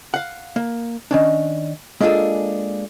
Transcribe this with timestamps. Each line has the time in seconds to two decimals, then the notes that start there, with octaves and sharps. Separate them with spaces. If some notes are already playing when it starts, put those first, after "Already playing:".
0.14 F5 F#5
0.56 A#3
1.11 D#3 C#4 D4
2.00 G#3 A#3 D4 F4 G#4 A4